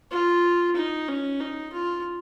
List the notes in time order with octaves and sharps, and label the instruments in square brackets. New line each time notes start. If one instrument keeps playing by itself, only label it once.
[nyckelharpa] F4
D#4
C#4
D#4
F4